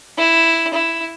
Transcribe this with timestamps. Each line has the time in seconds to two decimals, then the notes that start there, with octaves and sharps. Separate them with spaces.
0.18 E4
0.73 E4